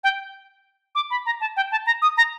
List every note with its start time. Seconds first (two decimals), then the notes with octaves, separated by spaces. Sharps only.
0.04 G5
0.95 D6
1.11 B5
1.26 A#5
1.41 A5
1.57 G5
1.71 A5
1.86 A#5
2.02 D#6
2.17 A#5